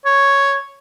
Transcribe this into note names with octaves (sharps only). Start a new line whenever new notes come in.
C#5